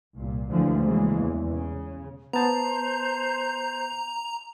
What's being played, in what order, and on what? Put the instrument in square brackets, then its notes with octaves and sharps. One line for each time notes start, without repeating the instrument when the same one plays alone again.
[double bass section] C2 A#2
D2 D3 E3 F3 G#3 A3
C#3 E3 G#3 A#3
E2
C#3
[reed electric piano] B3 A5 [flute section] C5 G6 [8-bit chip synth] A#5